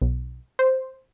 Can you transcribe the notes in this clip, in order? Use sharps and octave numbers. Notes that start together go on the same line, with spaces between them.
B1
C5